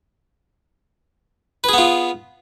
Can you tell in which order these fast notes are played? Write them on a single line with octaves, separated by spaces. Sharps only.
B4 G#4 B3 F4